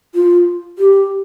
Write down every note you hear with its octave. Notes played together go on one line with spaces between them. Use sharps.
F4
G4